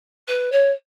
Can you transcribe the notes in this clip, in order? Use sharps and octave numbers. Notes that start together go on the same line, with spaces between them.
B4
C#5